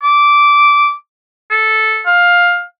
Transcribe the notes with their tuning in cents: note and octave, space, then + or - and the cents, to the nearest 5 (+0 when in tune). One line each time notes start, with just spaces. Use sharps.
D6 -10
A4 -10
F5 +15